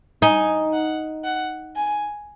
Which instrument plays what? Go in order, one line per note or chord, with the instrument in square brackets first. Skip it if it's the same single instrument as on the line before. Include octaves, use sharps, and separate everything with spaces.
[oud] D#4 [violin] G#5
[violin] F#5
F#5
G#5